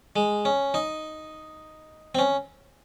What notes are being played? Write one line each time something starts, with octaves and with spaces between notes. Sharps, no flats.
G#3
C#4
D#4
C4
C#4